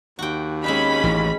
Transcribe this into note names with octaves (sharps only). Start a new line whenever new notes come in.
D#2 F#4 G5
G#3 C4 C#4 D#4 B5
A1 E3